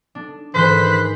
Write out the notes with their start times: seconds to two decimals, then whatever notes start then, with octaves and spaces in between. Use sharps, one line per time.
0.15 D4
0.55 G#2 D#3 E3 C5 F#6 B6